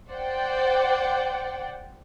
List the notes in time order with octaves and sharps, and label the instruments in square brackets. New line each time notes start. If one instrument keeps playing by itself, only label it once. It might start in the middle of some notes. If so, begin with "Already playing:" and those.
[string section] C5 D5 F#5 G5